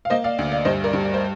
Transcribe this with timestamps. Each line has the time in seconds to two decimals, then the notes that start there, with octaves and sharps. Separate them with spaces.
0.05 F5
0.10 A#3 C5 D#5
0.24 D5 F5
0.39 D2
0.52 D5 F5
0.65 G2 C5 D#5
0.84 A#4 D5
0.93 G2
1.03 D5
1.14 C5